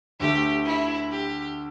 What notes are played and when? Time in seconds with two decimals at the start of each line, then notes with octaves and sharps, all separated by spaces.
0.20 D2 D3 A3 G4
0.65 E4
1.11 G4